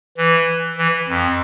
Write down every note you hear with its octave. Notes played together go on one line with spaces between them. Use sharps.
E3
E3
F2